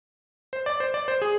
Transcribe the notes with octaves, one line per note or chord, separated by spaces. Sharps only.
C5
D5
C5
D5
C5
G#4